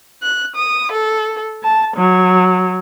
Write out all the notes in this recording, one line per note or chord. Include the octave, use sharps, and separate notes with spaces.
F#6
D#6
A4
A5
F#3